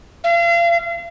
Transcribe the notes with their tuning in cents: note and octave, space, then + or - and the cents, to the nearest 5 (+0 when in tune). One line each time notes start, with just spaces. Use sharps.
F5 -35